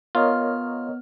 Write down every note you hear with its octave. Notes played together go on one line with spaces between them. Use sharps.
B3 F4 A#4 C#5 D#5 F6